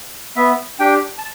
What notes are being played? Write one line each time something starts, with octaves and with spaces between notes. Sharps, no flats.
B3 E5
D4 G4 G5
A5